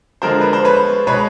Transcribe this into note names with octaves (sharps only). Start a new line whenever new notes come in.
D3 F3 G#3 A#4 C5
B4
C5
B4 C#5
B2 G#3 B4 C#5